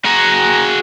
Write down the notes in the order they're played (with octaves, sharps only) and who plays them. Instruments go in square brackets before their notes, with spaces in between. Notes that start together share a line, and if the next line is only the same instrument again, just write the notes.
[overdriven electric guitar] F#4 G#4 [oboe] A#5